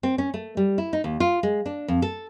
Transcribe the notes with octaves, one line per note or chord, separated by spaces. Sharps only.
C4
C#4
A3
G3
E4
D#4
D#2
F4
G#3
D4
F2
A4